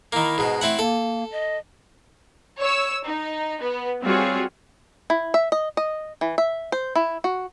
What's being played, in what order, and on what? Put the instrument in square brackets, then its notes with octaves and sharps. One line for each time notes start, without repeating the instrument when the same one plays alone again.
[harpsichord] D#3 A#3 [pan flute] E4
[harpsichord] G#2 B2
[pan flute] A3 [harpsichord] C4 E4 F#5
[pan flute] A#3 [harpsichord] A4
[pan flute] D#5
[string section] C#5 E6
D#4
B3
G3 C4 F4 F#4 G#4 C#5
[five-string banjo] E4
E5
D#5
D#5
E3
E5
C5
E4
F#4